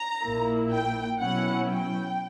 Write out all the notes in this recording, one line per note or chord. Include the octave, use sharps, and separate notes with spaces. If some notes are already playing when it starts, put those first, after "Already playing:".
Already playing: A#5
A#1 A#2 A#3 E4
G5
B2 F#3 C#4 E4 F#5
G5